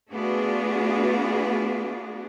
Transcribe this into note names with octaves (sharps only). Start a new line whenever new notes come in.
A3 B3 D4 F4 F#4 G#4